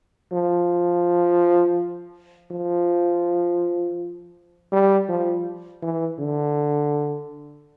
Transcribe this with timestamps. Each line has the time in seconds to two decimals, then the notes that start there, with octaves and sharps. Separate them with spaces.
0.32 F3
2.51 F3
4.72 G3
5.09 F3
5.82 E3
6.19 D3